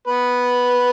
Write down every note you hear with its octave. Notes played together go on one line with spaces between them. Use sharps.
B3 B4